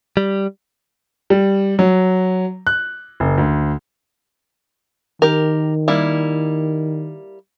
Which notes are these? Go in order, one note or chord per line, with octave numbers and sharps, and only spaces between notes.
G3
G3
F#3
F#6
F#1
D2
D#3 G4 A#4
G3 A#3 E4